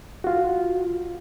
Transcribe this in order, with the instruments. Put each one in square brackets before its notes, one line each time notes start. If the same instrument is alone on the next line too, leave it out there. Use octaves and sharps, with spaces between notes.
[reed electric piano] F4 F#4